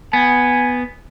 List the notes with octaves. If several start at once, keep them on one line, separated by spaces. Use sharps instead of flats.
B3 G#5